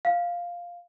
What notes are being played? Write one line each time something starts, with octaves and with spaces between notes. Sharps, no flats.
F5